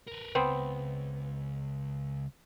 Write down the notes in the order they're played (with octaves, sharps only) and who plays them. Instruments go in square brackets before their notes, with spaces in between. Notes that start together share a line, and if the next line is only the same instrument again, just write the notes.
[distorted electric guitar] A#4 B4
[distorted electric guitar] C#2 [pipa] B3 C4